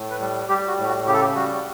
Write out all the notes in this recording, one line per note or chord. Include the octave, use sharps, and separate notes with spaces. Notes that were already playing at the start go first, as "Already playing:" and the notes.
Already playing: A2
B4
G3
G3 G4
F#4
A2
F#4
C#3 G4
A4
G4
G3 F#4